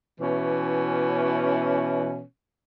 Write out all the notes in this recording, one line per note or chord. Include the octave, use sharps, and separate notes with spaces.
B2 E3 C#4